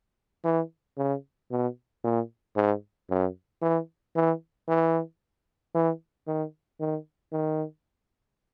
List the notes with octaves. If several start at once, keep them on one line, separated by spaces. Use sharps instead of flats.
E3
C#3
B2
A#2
G#2
F#2
E3
E3
E3
E3
D#3
D#3
D#3